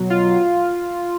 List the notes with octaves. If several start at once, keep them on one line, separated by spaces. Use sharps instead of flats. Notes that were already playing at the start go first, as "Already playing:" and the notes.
Already playing: B2 F#3
F4